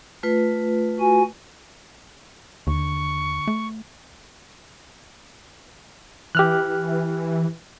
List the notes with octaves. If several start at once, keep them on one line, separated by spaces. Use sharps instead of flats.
A3 F4 B4
F#4 G#5
D#2 D3 C#6
A3
E3 G4 F6 F#6